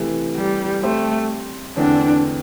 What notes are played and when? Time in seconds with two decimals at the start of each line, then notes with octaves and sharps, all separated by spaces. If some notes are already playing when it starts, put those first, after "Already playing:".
Already playing: C3 E3 A3
0.36 G3
0.82 G3 A3 C4 G4 C5
1.77 E2 D3 A3 C4 D4